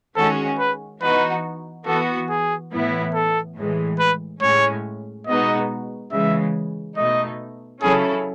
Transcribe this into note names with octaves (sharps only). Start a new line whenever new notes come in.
D#3 G#3 C#4 F#4 A4
B4
E3 B3 D#4 F#4 B4
E3 B3 F#4 A4
G#4
A2 E3 B3 E4
A4
A2 E3 G#3
B4
A2 G#3 C#4 C#5
B2 G#3 B3 D#4 F#4 D#5
C#3 E3 G#3 E5
B2 A3 D#4 D#5
C#3 F#3 C#4 E4 G#4 A4